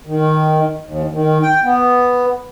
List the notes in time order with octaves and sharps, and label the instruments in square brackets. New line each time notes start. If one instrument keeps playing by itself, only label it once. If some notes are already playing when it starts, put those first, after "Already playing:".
[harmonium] D#3
D#2
D#3
G5
B3